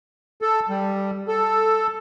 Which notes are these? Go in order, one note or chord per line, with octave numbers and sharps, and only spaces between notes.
A4
G3
A4